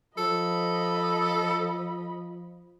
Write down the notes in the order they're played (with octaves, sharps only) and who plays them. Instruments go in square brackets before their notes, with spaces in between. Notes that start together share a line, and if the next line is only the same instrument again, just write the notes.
[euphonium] F3 [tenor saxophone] A4 [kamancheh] D#5 B5